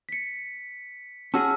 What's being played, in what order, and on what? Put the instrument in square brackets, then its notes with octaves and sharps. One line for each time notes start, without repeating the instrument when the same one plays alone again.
[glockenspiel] B6 C#7
[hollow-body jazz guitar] C#4 F#4 G#4 [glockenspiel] A5 E6 F6